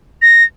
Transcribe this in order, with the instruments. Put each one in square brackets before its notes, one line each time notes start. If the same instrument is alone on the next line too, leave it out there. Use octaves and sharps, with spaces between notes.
[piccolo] A#6